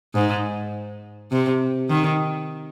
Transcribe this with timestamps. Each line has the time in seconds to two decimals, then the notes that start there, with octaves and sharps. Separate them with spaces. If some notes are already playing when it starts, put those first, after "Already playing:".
0.15 G#2
1.32 C3
1.90 D#3